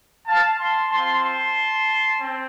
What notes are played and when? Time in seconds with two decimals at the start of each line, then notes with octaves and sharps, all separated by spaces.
0.27 F5 A5
0.59 A5 C6
0.91 C4 F4 A5 C6
1.23 A5 C6
2.18 C4